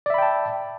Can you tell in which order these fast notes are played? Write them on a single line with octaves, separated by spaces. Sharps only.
D5 E5 B5 G5 A5